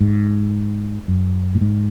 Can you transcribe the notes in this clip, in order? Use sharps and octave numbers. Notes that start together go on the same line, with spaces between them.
G#2
F#2
A2
G#2